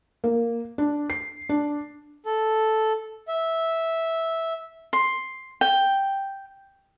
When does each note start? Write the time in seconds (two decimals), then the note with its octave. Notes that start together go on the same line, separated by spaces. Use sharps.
0.24 A#3
0.78 D4
1.10 C7
1.49 D4
2.26 A4
3.28 E5
4.93 C6
5.61 G5